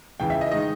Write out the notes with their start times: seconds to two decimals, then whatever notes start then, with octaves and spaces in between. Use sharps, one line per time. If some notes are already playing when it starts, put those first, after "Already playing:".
0.20 C#2 C#3 E3 G5
0.30 E5
0.41 D#5
0.52 D#3 G#3 D#4 D#5